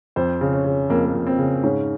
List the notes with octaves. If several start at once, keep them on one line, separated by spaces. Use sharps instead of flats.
F2 C5
C#3
C#4
C#3
F2 A#3
A#3
F2
C4
C#3
G#2 C#4